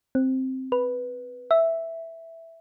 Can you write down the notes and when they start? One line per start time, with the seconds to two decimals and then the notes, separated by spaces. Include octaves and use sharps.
0.15 C4
0.72 B4
1.51 E5